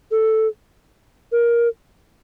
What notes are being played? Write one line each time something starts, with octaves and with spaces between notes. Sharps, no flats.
A4
A#4